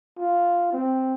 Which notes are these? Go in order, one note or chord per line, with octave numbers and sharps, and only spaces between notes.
F4
C4